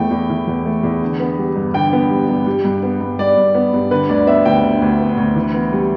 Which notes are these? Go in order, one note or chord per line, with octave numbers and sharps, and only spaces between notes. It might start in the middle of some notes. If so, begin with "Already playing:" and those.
Already playing: E2 E3 A3 G5
E2
E3
E2
A3
E2
D3
B3
G3
G2
D3 G5
B3
G3
G2
G3
G2
B3
G2
G3 D5
G2
B3
G2
D3 B4
D2 D5
B3 E5
D2 G5
D3
D2
B3
D2
E3
B3
G3